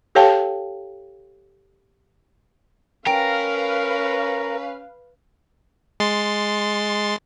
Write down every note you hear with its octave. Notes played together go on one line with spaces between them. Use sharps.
G4 A4 C#5 F5 G5 A5
C#4 A#4 B4 F5 G5 D7
G#3 C6 A6